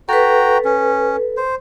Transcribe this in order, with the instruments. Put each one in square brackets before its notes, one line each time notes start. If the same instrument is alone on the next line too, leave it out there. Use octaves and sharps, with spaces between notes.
[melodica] F#4 G5 A#5 [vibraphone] A4 B4
[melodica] C#4
C5